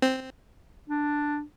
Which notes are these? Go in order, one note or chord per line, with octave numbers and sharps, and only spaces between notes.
C4
D4